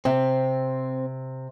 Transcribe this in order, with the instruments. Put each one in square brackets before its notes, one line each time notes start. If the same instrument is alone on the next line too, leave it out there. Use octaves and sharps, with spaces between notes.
[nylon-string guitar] C3 [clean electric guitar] C4